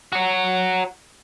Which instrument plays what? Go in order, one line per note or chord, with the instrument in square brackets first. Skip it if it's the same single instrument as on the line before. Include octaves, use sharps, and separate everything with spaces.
[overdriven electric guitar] F#4 C#5